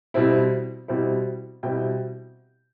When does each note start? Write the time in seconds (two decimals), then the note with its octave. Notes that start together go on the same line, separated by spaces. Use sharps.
0.14 B2 G3 C4 E4
0.88 B2 G3 C4 E4
1.63 B2 G3 C4 E4 E5 G5